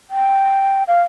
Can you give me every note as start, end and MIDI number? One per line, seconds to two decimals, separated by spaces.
0.10 0.83 79
0.87 1.02 77